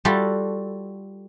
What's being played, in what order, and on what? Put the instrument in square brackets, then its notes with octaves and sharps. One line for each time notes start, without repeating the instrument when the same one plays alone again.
[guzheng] G3 F4 F#4 A4 F5